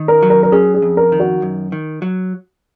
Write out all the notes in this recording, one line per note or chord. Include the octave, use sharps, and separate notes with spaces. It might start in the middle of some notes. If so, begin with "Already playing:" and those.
Already playing: D#3
A#4
F#3
A#4
A#4
C#4 G#4
G#4
F2
A#4
D#3
F#4
F#2
D#3
F#3